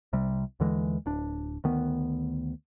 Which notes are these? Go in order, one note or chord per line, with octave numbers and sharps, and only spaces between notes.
C2 C3 G3
D#2 D3 E3 G#3
D1 D4
D2 D#3 B3